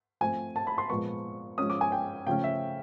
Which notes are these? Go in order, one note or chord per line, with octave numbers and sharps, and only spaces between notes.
F3 A3 C4 G#5
A5
B5
C6
A#2 F3 G#3 B3 C#6
F3 G#3 C#4 D#6
D6
G#5
G5
C#3 F3 A3 C#4 G5
E5